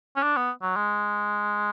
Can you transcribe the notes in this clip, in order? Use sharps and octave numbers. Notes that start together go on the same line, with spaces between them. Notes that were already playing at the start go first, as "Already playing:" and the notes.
C#4
D4
B3
F#3
G#3